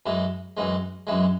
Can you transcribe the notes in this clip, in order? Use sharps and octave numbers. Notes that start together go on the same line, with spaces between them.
F#2 E3 G#3
F#2 E3 G#3
F#2 E3 G#3